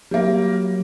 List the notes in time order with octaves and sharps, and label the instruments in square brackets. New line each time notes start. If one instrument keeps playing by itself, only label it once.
[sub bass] F#3 [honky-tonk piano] G3 A#3